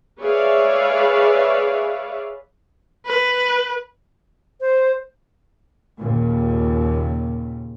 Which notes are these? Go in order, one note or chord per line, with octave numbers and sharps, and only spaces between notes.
G#4 B4 C#5 D5 E5 F5
B4
C5
D#2 A#2 C#3